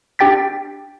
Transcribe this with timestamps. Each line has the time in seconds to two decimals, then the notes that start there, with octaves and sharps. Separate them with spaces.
0.19 D4 G4 G5 A6 B6